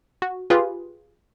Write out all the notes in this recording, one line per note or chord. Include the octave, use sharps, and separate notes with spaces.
F#4
F4 G4 G#4 B4